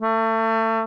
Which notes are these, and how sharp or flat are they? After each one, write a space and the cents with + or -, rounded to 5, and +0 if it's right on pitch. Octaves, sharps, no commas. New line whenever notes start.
A3 +30